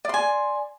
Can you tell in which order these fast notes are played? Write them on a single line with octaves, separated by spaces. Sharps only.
D5 C6 G#5